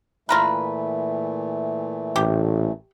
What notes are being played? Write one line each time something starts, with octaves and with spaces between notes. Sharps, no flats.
A#2 E3 A3 F4 A#4 B4
A1 G4